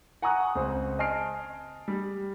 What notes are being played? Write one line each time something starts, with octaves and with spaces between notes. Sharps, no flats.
F#5 G#5 A#5 C#6 D#6 F#6
C#2 C4 C5
D#5 G#5 A5 F6 C7 D7
G3